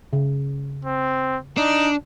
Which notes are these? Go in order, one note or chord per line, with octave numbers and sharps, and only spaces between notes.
C#3
C4
D4 D#4